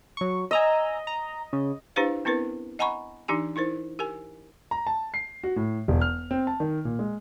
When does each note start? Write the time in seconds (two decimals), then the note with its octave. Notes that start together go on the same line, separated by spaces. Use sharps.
0.17 F#3 C#6
0.51 D#5 G#5 A#5 E6
1.07 A#5
1.53 C#3
1.96 D4 E4 G4 B4 C5 F5
2.25 B3 C4 E4 A#4 B4
2.79 D#5 F#5 G#5 A#5 B5 C#6
3.28 E3 D4 D#4 G4 G#5
3.56 D#4 E4 A#4 C5
3.99 G4 A#4 G#5
4.71 A#5
4.87 A5
5.14 C7
5.44 F#4
5.56 A2
5.88 E1
6.01 F6
6.31 C4
6.47 A5
6.60 D#3
6.85 A#2
6.99 G#3